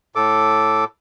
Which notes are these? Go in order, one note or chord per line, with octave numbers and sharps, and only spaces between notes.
A2 A4 D6